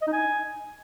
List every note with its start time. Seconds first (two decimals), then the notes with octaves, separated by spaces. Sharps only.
0.02 D#5
0.07 D#4
0.13 G#5